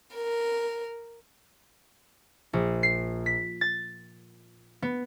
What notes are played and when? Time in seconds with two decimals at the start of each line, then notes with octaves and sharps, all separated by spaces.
0.15 A#4
2.53 A#1
2.83 C7
3.26 B6
3.61 A6
4.82 B3